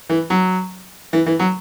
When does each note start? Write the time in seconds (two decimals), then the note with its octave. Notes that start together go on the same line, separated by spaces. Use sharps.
0.09 E3
0.30 F#3
1.13 E3
1.26 E3
1.39 F#3